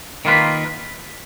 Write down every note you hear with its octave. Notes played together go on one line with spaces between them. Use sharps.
D#3 A#3 F4 B4